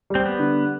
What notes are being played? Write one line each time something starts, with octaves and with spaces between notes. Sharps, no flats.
G3 C4
B3
D3